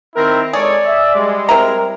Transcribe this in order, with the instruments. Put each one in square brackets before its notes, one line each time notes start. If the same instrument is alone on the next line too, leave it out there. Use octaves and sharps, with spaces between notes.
[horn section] D#3 C4 E4 [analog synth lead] A#4
[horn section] G#3 A4 C#5 [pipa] G#4 [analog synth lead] D5
[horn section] E5
G3 G#3
[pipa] C4 E4 A#5 [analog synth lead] A#4